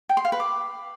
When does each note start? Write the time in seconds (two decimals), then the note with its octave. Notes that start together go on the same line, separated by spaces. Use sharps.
0.09 G5
0.17 C6
0.25 F5
0.32 B4
0.40 D6